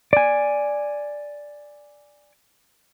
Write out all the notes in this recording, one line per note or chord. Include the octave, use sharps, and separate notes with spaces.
D5 G#5